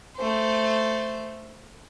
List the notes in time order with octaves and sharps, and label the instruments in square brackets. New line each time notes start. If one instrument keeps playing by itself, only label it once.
[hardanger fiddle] A3 C5